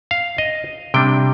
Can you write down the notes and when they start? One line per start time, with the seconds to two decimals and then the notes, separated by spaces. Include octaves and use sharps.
0.11 F5
0.38 D#5
0.94 C3 G3 D4 G5